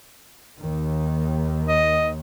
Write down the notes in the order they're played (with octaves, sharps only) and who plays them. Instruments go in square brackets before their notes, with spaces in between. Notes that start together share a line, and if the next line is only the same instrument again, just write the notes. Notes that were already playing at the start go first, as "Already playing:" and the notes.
[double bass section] D#2 D#3
[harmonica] D#5